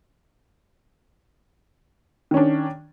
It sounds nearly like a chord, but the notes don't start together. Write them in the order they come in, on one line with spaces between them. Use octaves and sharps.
D#3 C#4 D4